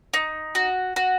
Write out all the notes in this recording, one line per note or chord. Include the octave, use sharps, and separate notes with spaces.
D#4
F#4
F#4